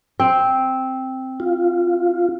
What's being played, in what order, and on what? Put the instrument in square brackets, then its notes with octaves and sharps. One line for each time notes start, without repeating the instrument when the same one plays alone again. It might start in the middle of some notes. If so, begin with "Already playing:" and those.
[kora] C4
[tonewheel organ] F4